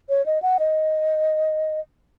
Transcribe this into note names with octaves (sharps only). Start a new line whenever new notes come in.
C#5
D#5
F#5
D#5